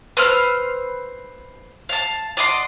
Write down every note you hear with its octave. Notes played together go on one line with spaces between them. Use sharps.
B4 C5 E6 F6
F5 A5
D5 D#5 F#5 C6